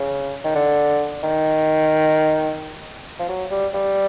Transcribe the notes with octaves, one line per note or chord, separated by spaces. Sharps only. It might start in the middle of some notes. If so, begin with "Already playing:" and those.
Already playing: C#3
D#3
D3
D#3
F3
F#3
G3
G3